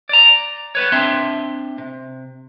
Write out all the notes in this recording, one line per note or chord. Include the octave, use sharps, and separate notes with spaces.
D5 A#5
B3 B4 C#5
C4 D4 E5 C6
C3